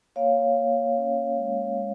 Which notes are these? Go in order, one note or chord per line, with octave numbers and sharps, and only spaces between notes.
A#3 C#5 F5
A#3
C#4
G#3
G#3